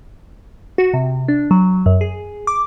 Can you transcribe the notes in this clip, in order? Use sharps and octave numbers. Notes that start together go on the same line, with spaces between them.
F#4
C3
D4
F#3
F#2
G#4
D6